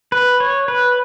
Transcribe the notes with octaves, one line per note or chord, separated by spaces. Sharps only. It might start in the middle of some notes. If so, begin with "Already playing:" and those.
B4
C#5
B4